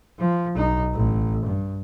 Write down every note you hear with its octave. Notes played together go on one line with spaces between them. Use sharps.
F3
B1 D#4
A1
G2